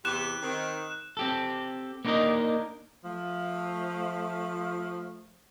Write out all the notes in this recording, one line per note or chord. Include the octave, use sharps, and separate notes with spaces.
E2 C3 G4 F#6 E7
D#3 C4
C4 G4 A4
A#3 B3 D4 D#4 A#4 D#5
F3 A3